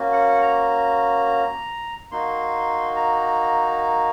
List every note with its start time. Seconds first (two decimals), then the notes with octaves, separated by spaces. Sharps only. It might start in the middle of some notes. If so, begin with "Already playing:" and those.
Already playing: A#3 C#4 F#4
0.13 F#5
0.42 A#5
2.11 A#3 D#4 F#4 C6
2.96 A#5